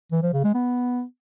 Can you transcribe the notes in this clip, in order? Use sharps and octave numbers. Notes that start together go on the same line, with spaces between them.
E3
F3
C#3
G#3
B3